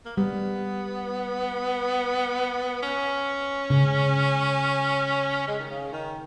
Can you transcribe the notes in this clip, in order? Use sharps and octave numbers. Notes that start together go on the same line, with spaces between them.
A#3
G3 B3
C#4
C#3
G#3
D#3
C#3
D#3